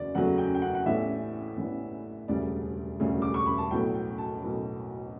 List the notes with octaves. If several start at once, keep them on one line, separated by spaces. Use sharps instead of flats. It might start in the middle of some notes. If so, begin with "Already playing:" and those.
Already playing: F#1 E2 C#3 F#3 D5
F#1 E2 C#3 F#3 A3 F#5
G5
G5
F#5
F#5
A1 A2 E3 B3 D4 E5
A1 A2 E3 B3 D4
E1 D2 C#3 G3 D5
E1 D2 C#3 G3
D6
C#6
B5
A5
B1 A2 F#3 B3 G5
G5
A5
B1 A2 F#3 B3